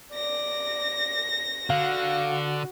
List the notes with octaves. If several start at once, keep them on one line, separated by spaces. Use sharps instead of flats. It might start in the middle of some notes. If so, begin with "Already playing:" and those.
D5 A#6
D3 F#4 F5